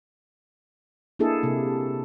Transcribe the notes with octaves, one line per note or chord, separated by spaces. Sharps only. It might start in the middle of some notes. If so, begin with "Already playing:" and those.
A#3 D4 E4 G#4 A4
C3 A#3